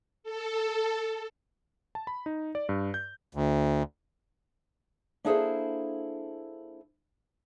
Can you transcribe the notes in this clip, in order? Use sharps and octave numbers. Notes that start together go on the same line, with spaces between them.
A4
A5
B5
D#4
D5
G2
G6
D2
A#3 D4 E4 G#4 A4 C5